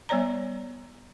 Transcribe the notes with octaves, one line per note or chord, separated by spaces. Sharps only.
G3 B3 C#5 D5 A#5